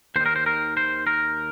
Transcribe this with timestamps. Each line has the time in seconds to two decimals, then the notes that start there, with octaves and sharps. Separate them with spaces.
0.16 D#2 C5
0.20 D#3
0.26 A#4
0.36 C5
0.46 A#4
0.77 C5
1.07 A#4